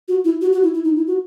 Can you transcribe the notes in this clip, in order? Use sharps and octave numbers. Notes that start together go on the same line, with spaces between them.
F#4
E4
F#4
F#4
E4
E4
D#4
E4
F#4